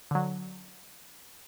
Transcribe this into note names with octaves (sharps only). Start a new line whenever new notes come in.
D3 F#3